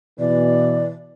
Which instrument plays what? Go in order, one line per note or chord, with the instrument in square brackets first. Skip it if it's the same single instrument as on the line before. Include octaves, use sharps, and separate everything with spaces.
[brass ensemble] B2 E3 [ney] D5